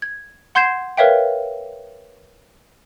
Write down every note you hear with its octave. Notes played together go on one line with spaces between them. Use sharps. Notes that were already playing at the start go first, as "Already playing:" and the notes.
G#6
F#5 C6 G6 G#6 C7 E7
A#4 B4 C#5 E5 F5 G5